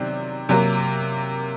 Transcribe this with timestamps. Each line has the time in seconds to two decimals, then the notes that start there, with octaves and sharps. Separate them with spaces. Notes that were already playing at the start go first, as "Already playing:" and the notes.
Already playing: C3 D#3 F#3 C4 D5
0.49 C3 F#3 A#3